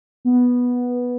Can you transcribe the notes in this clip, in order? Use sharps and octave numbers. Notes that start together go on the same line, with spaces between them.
B3